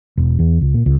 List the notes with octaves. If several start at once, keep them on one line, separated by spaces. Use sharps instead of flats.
E1
E2
C#2
A#2
C#2